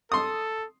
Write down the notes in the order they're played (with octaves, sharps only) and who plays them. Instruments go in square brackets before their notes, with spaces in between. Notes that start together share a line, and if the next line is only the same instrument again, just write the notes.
[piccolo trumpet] A4 [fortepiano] C6 D#6